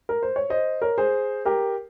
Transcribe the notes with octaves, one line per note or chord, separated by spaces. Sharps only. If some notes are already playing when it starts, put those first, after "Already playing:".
A#4
C5
C#5
C5 D#5
A#4 C#5
G#4 C5
G4 A#4